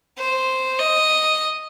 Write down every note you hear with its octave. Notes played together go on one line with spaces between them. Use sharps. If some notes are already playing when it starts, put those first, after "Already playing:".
C5
D#5